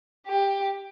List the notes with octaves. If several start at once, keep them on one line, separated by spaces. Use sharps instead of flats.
G4